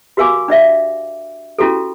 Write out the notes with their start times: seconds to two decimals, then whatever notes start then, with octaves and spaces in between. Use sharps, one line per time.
0.17 F#4 G4 A#4 F5 G#5 D6
0.48 D4 D5 E5 F5
1.59 C#4 E4 F#4 G4 A4